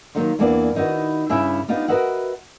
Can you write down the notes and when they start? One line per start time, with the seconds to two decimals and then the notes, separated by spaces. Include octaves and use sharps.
0.15 D#3 F#3 A#3 D#4 F4
0.39 E2 E3 A#3 B3 D4 D5
0.75 D#3 D#4 E4 F#4 B4
1.29 G2 C#3 E4 G4 E5 G#5
1.68 B3 D4 D#4 F4 G4
1.88 F#4 A#4 B4 D#5 E5 F#5